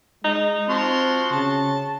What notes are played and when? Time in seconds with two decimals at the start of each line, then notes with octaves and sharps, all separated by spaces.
0.24 G#3 D#4
0.69 F3 C4 F#4 C6
1.33 C#3 A5